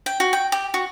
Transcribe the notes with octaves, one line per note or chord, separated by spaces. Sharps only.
G5
F#4
G5
G4
F#4